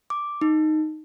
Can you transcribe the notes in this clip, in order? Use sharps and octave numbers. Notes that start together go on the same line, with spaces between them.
D6
D#4